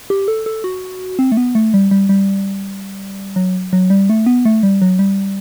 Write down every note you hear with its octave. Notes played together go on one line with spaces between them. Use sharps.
G4
A4
A4
F#4
C4
A3
B3
A3
G3
G3
G3
F#3
F#3
G3
A3
B3
A3
G3
F#3
G3